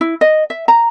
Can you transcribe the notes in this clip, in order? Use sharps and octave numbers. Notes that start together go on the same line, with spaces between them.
E4
D#5
E5
A#5